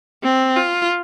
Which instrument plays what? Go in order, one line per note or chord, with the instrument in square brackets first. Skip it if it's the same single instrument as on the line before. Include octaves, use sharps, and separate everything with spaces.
[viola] C4
F4